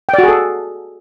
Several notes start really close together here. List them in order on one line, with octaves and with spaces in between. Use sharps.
G5 D5 F#4 G#4 A4